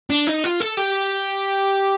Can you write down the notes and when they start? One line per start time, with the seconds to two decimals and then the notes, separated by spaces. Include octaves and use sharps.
0.10 D4
0.27 D#4
0.44 F4
0.60 A4
0.77 G4